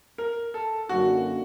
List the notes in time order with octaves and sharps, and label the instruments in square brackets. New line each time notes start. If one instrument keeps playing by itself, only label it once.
[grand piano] A#4
A4
[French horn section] F#2 D3 F#3 A#3 D#4 [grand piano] F#4